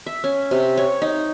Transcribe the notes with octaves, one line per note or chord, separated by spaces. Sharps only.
E5
C#4
C3
C#5
D#4